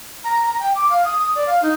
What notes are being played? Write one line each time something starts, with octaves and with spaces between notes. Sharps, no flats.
A#5
A#5
G5
D6
F5
D#6
D#6
D5
F5
D#4